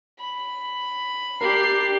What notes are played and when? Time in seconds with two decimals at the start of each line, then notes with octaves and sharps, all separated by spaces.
0.19 B5
1.41 D4 G4 A#4 C7